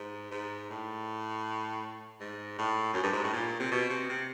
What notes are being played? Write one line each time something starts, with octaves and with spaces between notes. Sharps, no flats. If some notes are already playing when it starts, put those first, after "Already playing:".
Already playing: G#2
G#2
A2
G#2
A2
F#2
G2
G#2
A2
A#2
C3
B2
C3
C3